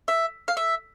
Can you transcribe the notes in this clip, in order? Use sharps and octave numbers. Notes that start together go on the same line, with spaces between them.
E5
F5
E5